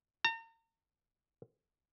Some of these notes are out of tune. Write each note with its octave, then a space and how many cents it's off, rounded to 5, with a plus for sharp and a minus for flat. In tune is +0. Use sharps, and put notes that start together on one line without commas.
A#5 -40